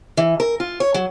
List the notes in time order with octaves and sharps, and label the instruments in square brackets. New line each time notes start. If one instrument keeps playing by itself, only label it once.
[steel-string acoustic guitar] E3
A#4
F4
C#5
F#3